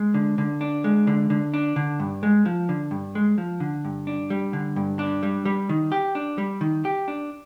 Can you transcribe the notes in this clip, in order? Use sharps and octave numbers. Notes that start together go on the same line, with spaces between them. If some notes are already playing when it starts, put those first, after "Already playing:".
Already playing: G#3
D3
D3
D4
G#3
D3
D3
D4
D3
G2
G#3
F3
D3
G2
G#3
F3
D3
G2
D4
G3
D3
G2
D4
G3
G3
D#3
G4
D4
G3
D#3
G4
D4